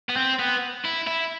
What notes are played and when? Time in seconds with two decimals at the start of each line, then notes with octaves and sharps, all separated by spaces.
0.09 B3
0.16 C4
0.39 B3
0.85 E4
1.07 E4